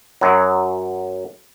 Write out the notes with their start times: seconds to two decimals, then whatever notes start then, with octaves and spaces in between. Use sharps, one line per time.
0.21 F#2 F#3